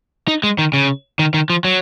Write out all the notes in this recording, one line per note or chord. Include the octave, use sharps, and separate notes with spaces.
D#4
G#3
D#3
C#3
D#3
D#3
F3
F#3